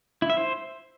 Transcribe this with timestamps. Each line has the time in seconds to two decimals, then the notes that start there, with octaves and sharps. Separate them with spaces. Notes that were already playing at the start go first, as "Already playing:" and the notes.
0.22 E4
0.30 E5
0.37 C5